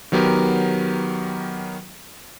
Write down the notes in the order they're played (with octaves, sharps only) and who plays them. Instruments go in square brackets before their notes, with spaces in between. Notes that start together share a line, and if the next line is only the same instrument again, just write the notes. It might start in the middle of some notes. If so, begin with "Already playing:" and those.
[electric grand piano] D#3 F#3 B3 G4 A#4